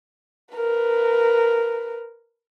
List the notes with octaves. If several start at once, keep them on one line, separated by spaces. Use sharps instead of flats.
A#4 B4